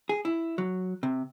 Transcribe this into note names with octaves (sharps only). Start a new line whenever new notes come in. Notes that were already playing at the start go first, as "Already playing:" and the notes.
G#4
E4
F#3
C3